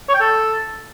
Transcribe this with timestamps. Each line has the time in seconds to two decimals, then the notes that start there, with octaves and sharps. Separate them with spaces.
0.09 C#5
0.14 G5
0.20 A4